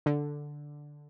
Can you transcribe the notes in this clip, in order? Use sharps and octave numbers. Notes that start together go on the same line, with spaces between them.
D3